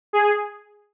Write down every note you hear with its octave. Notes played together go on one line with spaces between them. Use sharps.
G#4